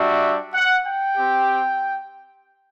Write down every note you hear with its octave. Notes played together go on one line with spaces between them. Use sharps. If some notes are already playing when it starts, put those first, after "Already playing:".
Already playing: G3 D4 F#4 E5
F#5
G5
C4 G4